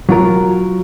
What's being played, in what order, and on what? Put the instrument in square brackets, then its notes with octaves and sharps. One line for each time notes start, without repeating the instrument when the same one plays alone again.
[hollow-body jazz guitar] F#3 F4 A#4